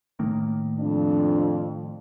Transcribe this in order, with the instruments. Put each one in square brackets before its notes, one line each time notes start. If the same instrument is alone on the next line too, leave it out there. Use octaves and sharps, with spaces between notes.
[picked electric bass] A2 D#3 A#3
[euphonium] F2 [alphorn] D4